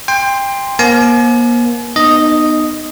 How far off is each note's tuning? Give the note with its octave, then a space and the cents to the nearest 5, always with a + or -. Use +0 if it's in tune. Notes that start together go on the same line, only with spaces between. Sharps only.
G5 +25 C6 +0
A#3 +40 C5 +30 G#5 +45
B3 +0 D#4 -25 D#5 +0